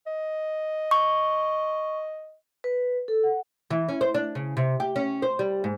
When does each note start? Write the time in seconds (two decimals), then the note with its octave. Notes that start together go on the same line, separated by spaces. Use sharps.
0.07 D#5
0.91 C#6
2.64 B4
3.08 A4
3.24 F#5
3.70 E3
3.89 C#4
4.01 C5
4.14 D4
4.35 C#3
4.57 C3
4.80 G4
4.96 C#4
5.22 C5
5.39 G3
5.64 G#2